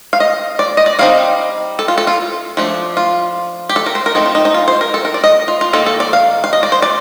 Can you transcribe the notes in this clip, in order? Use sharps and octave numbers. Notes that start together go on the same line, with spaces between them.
F5
D#5
D5
D#5
D5
G3 C4 D#4 F5
A4
F4
A4
F4
F3 A3 D4
F4
G4
A4
A#4
C5
A#4
A3 C4 D#4 A4
F4
D#4
D#4
F4
C5
A#4
A4
A#4
D5
D#5
F4
F4
D#3 A#3 D#4 A4
A4
D5
F5
F5
D#5
D5
C5
D5